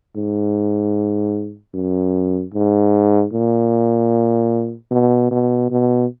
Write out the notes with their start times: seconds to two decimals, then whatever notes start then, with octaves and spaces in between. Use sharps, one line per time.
0.15 G#2
1.74 F#2
2.53 G#2
3.32 A#2
4.91 B2
5.31 B2
5.70 B2